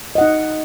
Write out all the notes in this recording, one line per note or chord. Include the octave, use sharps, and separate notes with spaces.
D#4 D#5 F#5